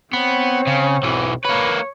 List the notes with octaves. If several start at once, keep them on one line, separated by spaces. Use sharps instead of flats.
B3 C4 C#5
C#3
B1 E3
A#3 B4 C#5